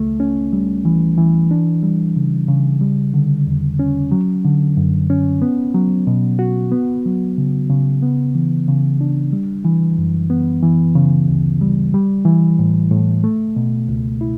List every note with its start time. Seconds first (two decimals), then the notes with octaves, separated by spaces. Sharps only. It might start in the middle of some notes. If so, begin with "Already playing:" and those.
Already playing: C#2 A3
0.20 C#4
0.53 G3
0.85 E3
1.18 E3
1.51 D4
1.83 G3
2.16 C#3
2.48 C#3
2.81 G3
3.14 D3
3.47 E2
3.79 C#4
4.11 F#3
4.45 D3
4.77 F#2
5.10 C#4
5.42 B3
5.75 F#3
6.07 B2
6.39 F#4
6.72 B3
7.05 F#3
7.38 C#3
7.69 C#3
8.03 B3
8.35 E3
8.68 C#3
9.01 D4
9.33 G3
9.65 E3
9.98 F#2
10.30 B3
10.63 E3
10.95 C#3
11.28 D2
11.61 G3
11.94 G3
12.25 E3
12.59 A2
12.91 A2
13.24 A3
13.56 B2
13.88 C#2
14.21 E4